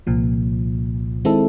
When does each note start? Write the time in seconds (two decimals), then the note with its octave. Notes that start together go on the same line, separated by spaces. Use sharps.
0.07 C2 A#2 F3
1.25 D#3 G#3 C4 E4 A4